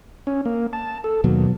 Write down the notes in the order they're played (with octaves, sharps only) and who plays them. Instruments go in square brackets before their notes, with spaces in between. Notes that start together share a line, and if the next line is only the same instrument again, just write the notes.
[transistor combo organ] C#4
A#3
A5
A4
[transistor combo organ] D#2 [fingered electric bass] B2 F#3